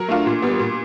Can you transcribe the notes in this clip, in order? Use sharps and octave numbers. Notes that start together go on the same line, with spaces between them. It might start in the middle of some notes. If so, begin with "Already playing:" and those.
Already playing: F#3 A#4
A3 D4 F4
A#2
G3 B3
A#2